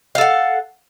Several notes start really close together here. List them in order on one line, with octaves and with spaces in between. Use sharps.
F5 A4 F#5